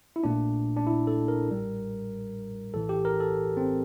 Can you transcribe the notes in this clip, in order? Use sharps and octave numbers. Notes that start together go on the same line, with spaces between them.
E4
A#1 A#2 A3 D4
D4
E4
A4
A#4
A1 A2 G3
A#1 A2 E3 A4
G4
A#4
A4
C4